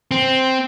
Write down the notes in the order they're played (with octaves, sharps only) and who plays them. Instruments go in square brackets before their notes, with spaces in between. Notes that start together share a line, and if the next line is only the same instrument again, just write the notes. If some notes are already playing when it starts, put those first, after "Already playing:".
[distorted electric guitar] C4